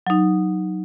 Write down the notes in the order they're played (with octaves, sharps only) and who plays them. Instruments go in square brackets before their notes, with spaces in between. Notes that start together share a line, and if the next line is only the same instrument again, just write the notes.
[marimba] F#3 D#4